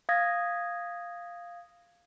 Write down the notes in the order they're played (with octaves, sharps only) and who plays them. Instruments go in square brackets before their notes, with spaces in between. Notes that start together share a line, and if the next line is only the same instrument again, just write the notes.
[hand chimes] F5 D#6 G#6 A#6